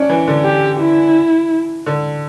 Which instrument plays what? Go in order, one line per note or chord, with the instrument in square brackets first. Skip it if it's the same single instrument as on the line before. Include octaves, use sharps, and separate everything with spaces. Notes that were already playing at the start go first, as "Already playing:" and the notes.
Already playing: [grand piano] C#4 D4
E3
D3
[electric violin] G4
E4
[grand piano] D3